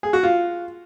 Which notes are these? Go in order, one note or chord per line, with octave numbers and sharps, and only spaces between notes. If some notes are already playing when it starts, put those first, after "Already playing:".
G#4
F#4
F4